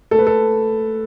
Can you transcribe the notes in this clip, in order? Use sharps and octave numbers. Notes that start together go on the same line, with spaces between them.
A3 A4
B4
A4